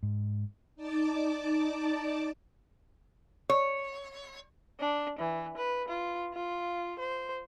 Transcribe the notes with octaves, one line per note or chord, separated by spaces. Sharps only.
G#2
D#4 D5 A5 D6
C#5
D4
E3
B4
F4
F4
C5